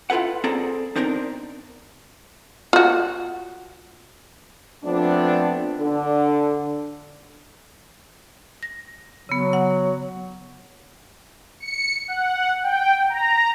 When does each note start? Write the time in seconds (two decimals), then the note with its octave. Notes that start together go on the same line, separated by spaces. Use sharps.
0.10 E4 F4 A4 B4 F#5
0.44 C4 G#4 A4 D5 A#5
0.95 B3 C4 D4 D#4 A#4
2.73 F4 F#4
4.84 F3 A3 B3 C4 D4
5.79 D3
8.63 A#6
9.29 C#3 F#3 B3
9.53 F#5
11.60 C#7
12.08 F#5
12.63 G5
13.10 A#5